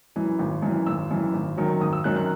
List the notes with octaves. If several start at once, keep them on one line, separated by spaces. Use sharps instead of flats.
F#2 E3
G#1
F#2
E3
G#1 E6
F#2 E3
G#1
F#2 D#3 F#3
G#1 D#6
E6
F#2 D#3 F#3 F#6
F#6